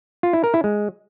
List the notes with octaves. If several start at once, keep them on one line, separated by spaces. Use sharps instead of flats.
F4
E4
A#4
E4
G#3